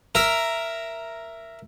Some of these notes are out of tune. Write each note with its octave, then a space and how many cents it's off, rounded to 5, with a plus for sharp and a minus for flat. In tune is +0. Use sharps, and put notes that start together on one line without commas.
A#4 +0 E5 +10